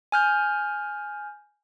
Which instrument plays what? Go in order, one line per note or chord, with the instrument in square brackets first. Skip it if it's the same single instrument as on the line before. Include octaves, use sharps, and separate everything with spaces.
[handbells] G#5 F6 G6